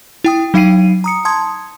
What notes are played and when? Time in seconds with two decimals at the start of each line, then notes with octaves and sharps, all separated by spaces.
0.24 E4 G5 D#6
0.54 F#3 D#4 F5 G5 C7 D#7
1.04 A#5 D#6 C#7
1.25 A5 C6 D#6 G#6